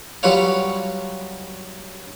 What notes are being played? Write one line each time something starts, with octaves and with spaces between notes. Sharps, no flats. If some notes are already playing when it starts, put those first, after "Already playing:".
F#3 G3 F4 B4 C#5 F5